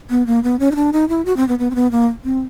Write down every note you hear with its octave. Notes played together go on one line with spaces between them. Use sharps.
B3
A#3
B3
C#4
D#4
D4
D#4
E4
F#4
C4
B3
B3
C4
B3
A#3
C4